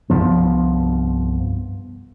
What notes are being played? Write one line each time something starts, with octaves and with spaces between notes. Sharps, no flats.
C2 G2 F3 B3